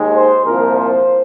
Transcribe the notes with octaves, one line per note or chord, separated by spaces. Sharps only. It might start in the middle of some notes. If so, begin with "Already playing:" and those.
Already playing: D#2 D#3 G#3
C5
C2 A#2 F3 A#4
C5